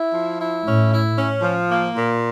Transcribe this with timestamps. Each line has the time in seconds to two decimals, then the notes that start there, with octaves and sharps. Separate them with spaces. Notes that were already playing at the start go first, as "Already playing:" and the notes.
Already playing: E4
0.13 F3
0.39 E4
0.65 A2 C#4
0.91 E4
1.17 C#4
1.42 F3
1.69 A#3
1.95 A#2